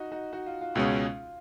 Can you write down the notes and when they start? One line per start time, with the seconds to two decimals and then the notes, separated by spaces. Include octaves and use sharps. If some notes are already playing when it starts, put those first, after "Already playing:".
Already playing: D#4 F#4
0.12 D#4 F#4
0.33 D#4 F#4
0.46 F4
0.61 F4
0.74 C#2 B2 G#3 C#4 F4